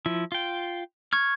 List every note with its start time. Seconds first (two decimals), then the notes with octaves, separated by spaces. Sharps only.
0.06 F3 E4
0.32 F4 G5
1.13 C#6 F6 G#6